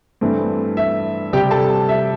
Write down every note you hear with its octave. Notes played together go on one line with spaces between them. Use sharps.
G2 E3 A3 C4
E5
C3 G3 C4 G4 G5
A4 A5
E5